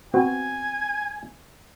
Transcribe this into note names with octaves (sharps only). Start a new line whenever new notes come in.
B3 C4 F#4 G#5